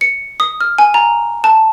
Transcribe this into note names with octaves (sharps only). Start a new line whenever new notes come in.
C#7
D#6
F6
G#5
A#5
A5